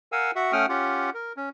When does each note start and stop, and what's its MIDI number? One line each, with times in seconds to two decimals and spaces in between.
0.12 0.31 70
0.12 0.31 77
0.12 0.31 78
0.12 0.31 80
0.12 0.31 88
0.35 0.52 66
0.35 0.52 76
0.35 0.52 78
0.52 0.66 57
0.52 0.66 61
0.52 0.66 78
0.52 0.66 79
0.52 0.66 87
0.52 0.66 89
0.69 1.10 61
0.69 1.10 65
0.69 1.10 67
0.69 1.10 78
1.14 1.33 70
1.37 1.49 61